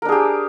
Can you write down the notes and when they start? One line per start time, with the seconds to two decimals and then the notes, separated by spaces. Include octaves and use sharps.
0.02 A#4
0.05 D4
0.09 G#4
0.12 G4